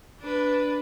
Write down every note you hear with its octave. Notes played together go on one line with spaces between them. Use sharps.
D4 B4